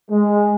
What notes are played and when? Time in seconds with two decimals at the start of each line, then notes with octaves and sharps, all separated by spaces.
0.10 G#3